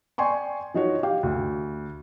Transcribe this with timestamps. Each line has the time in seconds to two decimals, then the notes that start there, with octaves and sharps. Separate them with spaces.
0.18 D5 G5 G#5 C6 C#6
0.74 F3 D#4 F#4 C#5
1.03 G4 F5 G5
1.23 D2